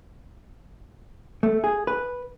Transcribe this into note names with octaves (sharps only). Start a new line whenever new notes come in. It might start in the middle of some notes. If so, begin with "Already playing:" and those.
A3
G#4
B4